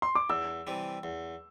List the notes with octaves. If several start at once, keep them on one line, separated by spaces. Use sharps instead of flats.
C6
D6
E2 E6
C3 E3 G3
E2